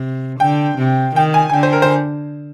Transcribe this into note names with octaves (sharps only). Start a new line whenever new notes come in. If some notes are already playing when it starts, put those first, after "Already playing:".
Already playing: C3
D3 G5
C3
D#3 G5
G#5
G#5
D3 G5
C5
A#4
C5